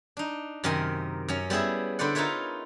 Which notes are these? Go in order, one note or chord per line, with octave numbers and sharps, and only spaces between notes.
D4 D#4
F#2 C3 D#3 A#4 G#5
F#2 C#4
G3 B3 E4 G#4 E5
D3 B4 C5 D5 F#5
D#4 F4 A#4 B4 C#5 E5